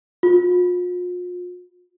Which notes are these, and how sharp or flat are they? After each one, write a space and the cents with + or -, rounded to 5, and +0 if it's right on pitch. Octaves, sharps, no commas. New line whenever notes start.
F4 +40